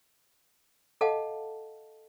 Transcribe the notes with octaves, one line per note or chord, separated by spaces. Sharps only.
A4 D#5 F5 F#5 A5